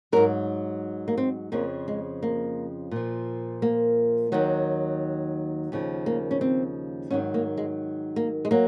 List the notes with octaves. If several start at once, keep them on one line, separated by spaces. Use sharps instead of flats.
G#2 F#3 A#4
A#3
C4
F2 C#3 F3 A#3
G#3
A#3
A#2 F3
A#3
D#2 D#3 F#3
D#2 C#3 F3
A#3
C#4
C4
G#2 D#3 F#3 C#4
A#3
G#3
A#3
G#3
F#3 A#3